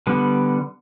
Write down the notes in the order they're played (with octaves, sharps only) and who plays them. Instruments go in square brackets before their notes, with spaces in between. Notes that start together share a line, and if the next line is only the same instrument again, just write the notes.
[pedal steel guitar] D3 G3 B3